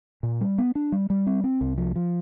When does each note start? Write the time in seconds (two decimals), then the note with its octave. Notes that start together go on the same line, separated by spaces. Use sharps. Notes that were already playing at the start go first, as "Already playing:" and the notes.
0.23 A#2
0.41 G3
0.58 B3
0.75 D4
0.92 G3
1.10 G3
1.27 C4
1.44 C4
1.61 C2
1.78 F3
1.96 F3